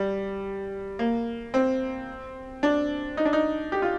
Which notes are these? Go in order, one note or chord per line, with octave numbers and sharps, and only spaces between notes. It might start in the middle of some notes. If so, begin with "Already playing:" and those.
Already playing: G3
A#3
C4
D4
D#4
D4
D#4
G4
F4